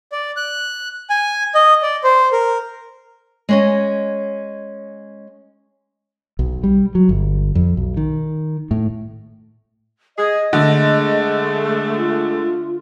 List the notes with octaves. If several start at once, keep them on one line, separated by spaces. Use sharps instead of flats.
D5
F#6
G#5
D#5
D5
C5
A#4
G#3 C#4 D#5
B1
G3
F#3
G1
F2
B1
D#3
A2
G#4 D#5
D3 G#3 A3
F4